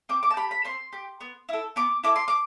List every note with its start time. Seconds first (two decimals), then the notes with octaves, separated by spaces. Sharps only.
0.09 C4 D6
0.23 D6
0.30 A5
0.37 G4 B5
0.51 B5
0.65 C4 C6
0.93 G4
1.21 B3
1.49 E4 A4
1.76 B3 D6
2.03 E4 A4 D6
2.16 C6
2.28 D6